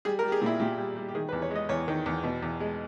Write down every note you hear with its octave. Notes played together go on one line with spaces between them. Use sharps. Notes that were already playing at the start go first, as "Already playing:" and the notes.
G3 G#4
A#4
G3 G4
G#4
A#2 E4
A#2 G4
G3
G3
G4
D#3 G#4
B4
E2
C#5
G#3 D#5
E2 C#5
D#3
E2
B2
E2
G#3